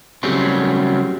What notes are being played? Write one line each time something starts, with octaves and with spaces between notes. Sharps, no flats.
C#3 F#3 G3 A3 C4